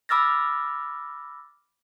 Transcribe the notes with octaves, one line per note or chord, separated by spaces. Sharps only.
B5 D6 E6 F6 A6 A#6